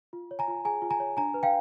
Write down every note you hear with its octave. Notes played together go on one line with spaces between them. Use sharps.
F4
C#5
G#5 A#5
F4
G#4 G#5 A#5
F4
G#5 A#5
C#5
D4 G#5 A#5
B4
F5 G5